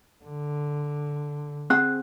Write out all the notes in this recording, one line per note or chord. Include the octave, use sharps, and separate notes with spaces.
D3
C4 G#4 F#5 F#6